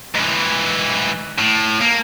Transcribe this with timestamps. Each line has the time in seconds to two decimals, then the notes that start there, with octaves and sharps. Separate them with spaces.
0.15 G#2 E3
1.38 A2
1.81 A#3